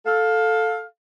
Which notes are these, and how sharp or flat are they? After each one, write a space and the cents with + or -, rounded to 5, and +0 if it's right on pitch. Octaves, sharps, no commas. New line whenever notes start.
A4 +0 F5 +20